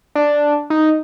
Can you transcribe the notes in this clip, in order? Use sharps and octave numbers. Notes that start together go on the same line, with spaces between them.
D4
D#4